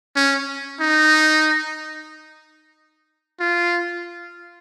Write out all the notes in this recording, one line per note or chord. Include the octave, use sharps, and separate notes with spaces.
C#4
D#4
F4